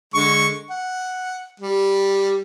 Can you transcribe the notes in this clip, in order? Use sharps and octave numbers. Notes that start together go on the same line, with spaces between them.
D3 G#3 C#6
F#5
G3